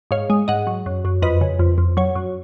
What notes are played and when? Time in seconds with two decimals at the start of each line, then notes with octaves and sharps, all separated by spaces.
0.11 G#2 C#5 F5
0.30 G#3
0.48 G#2 D#5 F#5
0.67 F#3
0.86 F#2
1.05 F#2
1.22 F2 B4 D#5
1.41 C#3
1.59 F2
1.78 F2
1.97 F#3 C#5
2.16 F#2